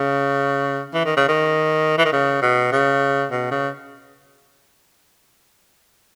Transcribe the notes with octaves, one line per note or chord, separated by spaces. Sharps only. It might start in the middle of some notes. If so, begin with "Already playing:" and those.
Already playing: C#3
E3
D#3
C#3
D#3
E3
D#3
C#3
B2
C#3
B2
C#3